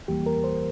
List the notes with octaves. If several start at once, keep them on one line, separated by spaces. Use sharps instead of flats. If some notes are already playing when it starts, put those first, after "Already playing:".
E2 E3 G3 A#3 G4
A#4
C5